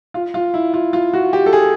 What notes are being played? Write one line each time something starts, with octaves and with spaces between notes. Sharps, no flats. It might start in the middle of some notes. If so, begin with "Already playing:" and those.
F4
F4
E4
F4
F4
F#4
G4
A4
G#4